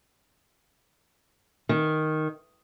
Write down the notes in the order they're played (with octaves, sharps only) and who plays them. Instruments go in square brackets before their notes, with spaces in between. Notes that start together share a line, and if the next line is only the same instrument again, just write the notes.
[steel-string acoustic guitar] D#3